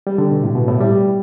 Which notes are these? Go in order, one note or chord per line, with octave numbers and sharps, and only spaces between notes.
G3
D3
B2
A2
B2
A2
G3